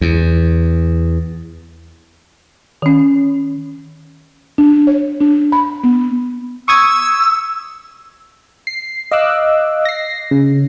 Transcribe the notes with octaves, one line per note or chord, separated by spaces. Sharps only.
E2
D#3 C#4
D4
C#5
D4
B5
B3
C#6 D#6 E6 G#6
C7
D#5 F5 D6 E6 F#6
A#6 C7
C#3